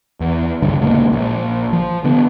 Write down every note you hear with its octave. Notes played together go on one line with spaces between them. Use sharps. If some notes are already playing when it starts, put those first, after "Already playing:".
E2
C#2 G2 D3
D#1 C#2 G#3 A#3
A#1
F3
D3 B3